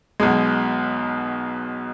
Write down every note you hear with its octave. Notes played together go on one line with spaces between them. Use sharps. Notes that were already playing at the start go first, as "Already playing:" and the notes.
B1 B2 G#3